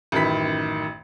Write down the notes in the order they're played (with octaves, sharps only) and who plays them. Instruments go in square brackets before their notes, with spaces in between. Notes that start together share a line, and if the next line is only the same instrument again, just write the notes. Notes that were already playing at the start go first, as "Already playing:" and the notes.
[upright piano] A1 F#2 D#3 B5 B6